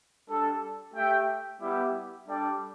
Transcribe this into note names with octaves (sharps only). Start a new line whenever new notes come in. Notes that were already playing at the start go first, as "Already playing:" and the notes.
G3 D4 A4
A3 G4 E5 G5
G3 B3 E4 G4
G3 D4 A4 D5 G5